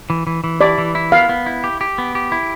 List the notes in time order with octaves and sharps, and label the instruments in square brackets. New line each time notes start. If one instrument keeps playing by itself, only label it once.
[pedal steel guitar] E3
E3
E3
[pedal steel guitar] E4 [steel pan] D5
[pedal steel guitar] E3
E4
[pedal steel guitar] B3 [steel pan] F5
[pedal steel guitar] B3
E4
G4
G4
B3
G4
E4